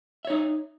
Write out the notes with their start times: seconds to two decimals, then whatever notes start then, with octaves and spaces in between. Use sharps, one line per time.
0.25 E5
0.27 C#5
0.30 D#4